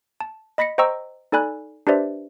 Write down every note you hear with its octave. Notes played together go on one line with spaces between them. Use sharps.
A5
D#5 B5 A#6 B6 C#7
C5 D#5 G5 A#5 C#6 E6
D#4 A4 D5 G#5 B5 F#6
D4 G4 B4 C5 D5 E5